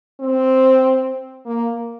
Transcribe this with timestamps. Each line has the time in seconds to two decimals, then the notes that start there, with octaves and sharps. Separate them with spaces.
0.20 C4
1.46 A#3